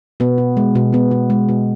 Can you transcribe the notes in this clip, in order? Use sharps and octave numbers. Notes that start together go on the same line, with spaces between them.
B2 B3
B2
G#3
B2
B2 B3
B2
G#3
B2